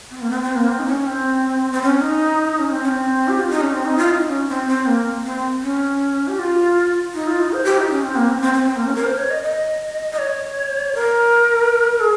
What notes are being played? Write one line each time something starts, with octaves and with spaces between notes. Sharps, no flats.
C4
A#3
C4
C4
A#3
C4
D#4
C#4
C4
C4
C#4
D#4
C#4
C4
C#4
C4
G4
F4
D#4
C#4
C4
D#4
F4
D#4
C#4
C4
C4
A#3
C4
C#4
G4
F4
D#4
F4
D#4
C5
G4
D#4
C#4
C4
A#3
C4
C4
C4
C4
A#3
C#4
A#4
C5
C#5
D#5
D#5
D#5
C#5
A#4
G#4